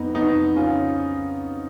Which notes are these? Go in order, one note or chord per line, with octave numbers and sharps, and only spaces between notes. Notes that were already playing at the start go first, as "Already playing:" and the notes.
Already playing: F2 B3 D#4
F2 B3 D#4
C#3 C#4 F4